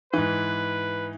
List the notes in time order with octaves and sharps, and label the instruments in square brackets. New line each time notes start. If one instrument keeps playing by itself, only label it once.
[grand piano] G#2 E3 [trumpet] B4